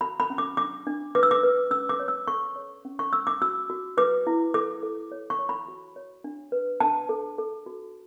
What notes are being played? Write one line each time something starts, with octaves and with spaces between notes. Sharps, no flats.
F#4 B5
B5
C#4
D6
D4 D6
D4
B4 D6
E6
D6
B4
C#4 E6
D6
C#5
E6
A4 C#6
C#5
C#4
C#6
C#4 E6
D6
F#4 E6
F#4
B4 D6
E4
A4 D6
A4
C#5
C#6
C#5
B5
F#4
C#5
D4
B4
D4 A5
A4
A4
F#4